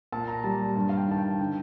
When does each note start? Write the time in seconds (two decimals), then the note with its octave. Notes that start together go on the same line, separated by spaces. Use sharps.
0.12 A#2 A5
0.28 A#5
0.44 G3 A5
0.76 G2 A5
0.89 F5
0.97 G5
1.08 D#3 A5
1.18 G5
1.40 D3 G5